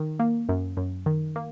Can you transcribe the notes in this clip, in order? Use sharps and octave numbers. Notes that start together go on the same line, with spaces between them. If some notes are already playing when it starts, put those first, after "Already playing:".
Already playing: D#3
A#3
F#2
F#2
D#3
A#3